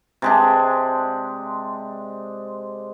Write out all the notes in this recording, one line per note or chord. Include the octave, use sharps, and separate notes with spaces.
C3 G#3 D4